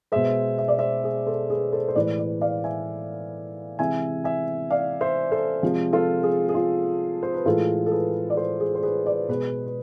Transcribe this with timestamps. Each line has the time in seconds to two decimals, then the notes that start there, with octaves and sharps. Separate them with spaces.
0.12 B2 G#3 C5 E5
0.58 E5
0.68 D5
0.79 C5 E5
1.04 G#4
1.27 A4 C5
1.50 G#4 B4
1.72 A4 C5
1.88 C5
1.96 A2 E3 G#3 B4 D5
2.18 B4 D5
2.41 D5 F5
2.64 E5 G#5
3.79 C3 E3 G#3 E5 G#5
4.24 E5 G#5
4.70 D5 F5
5.01 C5 E5
5.32 A4 C5
5.62 C3 F3 G#3
5.93 F4 A4
6.23 G#4
6.49 G#4
6.54 F4
7.23 C5
7.34 B4
7.46 A2 E3 G#3 F4 A4
7.86 A4
7.91 G#4 B4
8.30 D5
8.37 A4 C5
8.60 G#4
8.75 C5
8.83 G#4 B4
9.06 B4 D5
9.29 B2 G#3 G#4 B4
9.66 B4